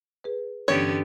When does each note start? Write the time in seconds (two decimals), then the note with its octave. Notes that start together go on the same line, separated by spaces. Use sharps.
0.24 G#4 B4
0.68 G2 D3 E3 B3 C#4 G4 C#5